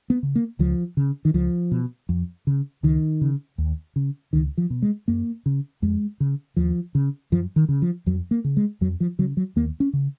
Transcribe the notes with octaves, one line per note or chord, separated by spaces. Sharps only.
B3
C#3
A#3
C#2 F3
C#3
D#3
C#2 F3
B2
F2
C#3
C#2 D#3
C#3
D#2
C#3
C#2 D#3
F3
B2
G#3
F#2 A#3
C#3
F2 G#3
C#3
D#2 F3
C#3
F#2 F3
D#3
C#3
F3
F2 F#3
A#3
C#3
G#3
F2 F#3
F3
C#3 F#3
F#3
D#2 A#3
C#4
C#3